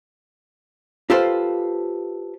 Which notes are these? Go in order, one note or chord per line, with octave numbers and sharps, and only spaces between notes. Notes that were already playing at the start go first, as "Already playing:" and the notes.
F4 G4 A4 B4 C5 F5